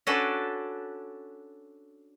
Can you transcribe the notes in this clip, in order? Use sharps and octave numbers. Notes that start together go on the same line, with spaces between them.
C#4 D4 F#4 A4 B4 D5